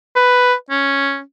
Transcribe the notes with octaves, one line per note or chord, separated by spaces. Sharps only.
B4
C#4